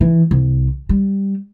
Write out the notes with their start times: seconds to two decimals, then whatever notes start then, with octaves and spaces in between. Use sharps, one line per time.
0.01 E3
0.31 C2
0.89 G3